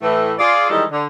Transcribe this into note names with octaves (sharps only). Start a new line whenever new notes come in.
A2 E3 A3
F4 G#4 D5
D#3 E3 G3 G#3 A4 D#5
D3